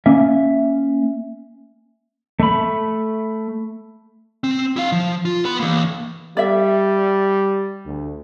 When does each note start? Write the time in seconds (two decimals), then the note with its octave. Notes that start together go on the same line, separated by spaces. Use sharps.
0.06 A#3 C#4 E5
2.40 A3 B5
4.44 C4
4.76 E4 F5
4.92 F3
5.25 F4
5.45 B3 B5
5.60 E3 A#3
6.37 G3 D5 E5
7.85 D2